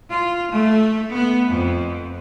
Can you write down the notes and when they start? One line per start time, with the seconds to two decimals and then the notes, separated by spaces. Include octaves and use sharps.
0.11 F4
0.52 A3
1.12 B3
1.50 F2